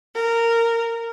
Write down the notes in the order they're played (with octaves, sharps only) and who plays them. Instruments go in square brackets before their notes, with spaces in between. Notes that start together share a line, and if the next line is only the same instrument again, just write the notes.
[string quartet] A#4